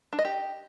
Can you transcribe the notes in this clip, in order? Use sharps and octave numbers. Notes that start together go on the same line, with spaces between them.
D4
D#5
G4